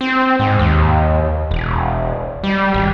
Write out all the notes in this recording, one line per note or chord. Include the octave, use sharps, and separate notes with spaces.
C4
G#2
D#2
E1
G3
G#1